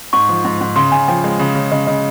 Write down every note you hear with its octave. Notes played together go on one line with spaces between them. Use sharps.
G#2 C#6
F3
G#2
G#2
C#3 C6
C#3 G#5
F3 G5
G#3
C#3
C#3
C#3 D#5
C#3 D#5